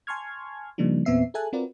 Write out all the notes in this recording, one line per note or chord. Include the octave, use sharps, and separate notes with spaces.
G#5 A5 C6 C#6 F6 G#6
C#3 F3 G3 A#3 D4 D#4
E2 A#2 B3 C4 E5 C7
G#4 A4 E5 G#5 A5 F#6
C4 F4 F#4 A#4 B4 D5